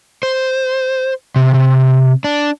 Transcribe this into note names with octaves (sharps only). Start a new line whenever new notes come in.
C5
C3
C3
D4